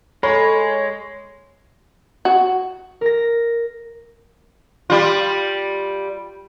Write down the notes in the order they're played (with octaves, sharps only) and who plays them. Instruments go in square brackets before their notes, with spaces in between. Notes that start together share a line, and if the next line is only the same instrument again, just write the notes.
[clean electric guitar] G#3 [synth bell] A4 [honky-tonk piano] C#5 [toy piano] A#5 B5
[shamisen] F#4
[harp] A#4 A#6
[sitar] G3 F4